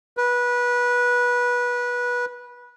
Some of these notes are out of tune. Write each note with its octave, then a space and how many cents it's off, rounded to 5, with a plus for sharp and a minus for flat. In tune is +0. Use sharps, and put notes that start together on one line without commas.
B4 -20